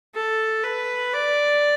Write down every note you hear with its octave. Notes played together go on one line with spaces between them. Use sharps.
A4
B4
D5